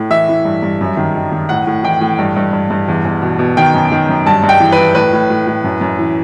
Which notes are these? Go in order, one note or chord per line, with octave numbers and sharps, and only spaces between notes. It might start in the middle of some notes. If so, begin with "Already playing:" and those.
Already playing: A2
E3 E5
E3
G2
G2
F#2
D#3
D#3
D#3
A2 F#5
A2
E3 G5
A2
G2
G2
G2
G2
E2
E2
B2
B2
D#3 G5
F#2
D#3
F#2
G2 A5
G2
G5
E3
B4
E3
A2 B4
A2
A2
A2
F#2
F#2
E3